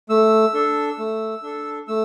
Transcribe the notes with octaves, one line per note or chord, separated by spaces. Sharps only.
A3 E6
D4 A4
A3
D4 A4
A3 E6